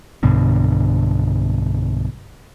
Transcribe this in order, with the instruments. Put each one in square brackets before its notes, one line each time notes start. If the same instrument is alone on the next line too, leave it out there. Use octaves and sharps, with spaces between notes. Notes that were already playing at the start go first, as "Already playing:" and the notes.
[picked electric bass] B1 G2 B2 D3